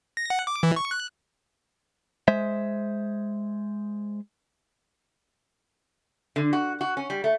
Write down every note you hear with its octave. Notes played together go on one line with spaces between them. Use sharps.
A#6
F#5
D6
E3
C#6
F#6
G#3 C5 E5
D3
F#4
F#4
C#4
G3
A3